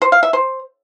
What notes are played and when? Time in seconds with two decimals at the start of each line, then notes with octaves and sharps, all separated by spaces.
0.02 C5
0.12 F5
0.23 E5
0.33 C5